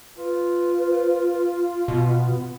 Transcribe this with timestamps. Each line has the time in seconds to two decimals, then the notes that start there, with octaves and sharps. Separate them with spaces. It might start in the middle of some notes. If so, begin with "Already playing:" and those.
0.18 F4 B4
1.88 B2 B3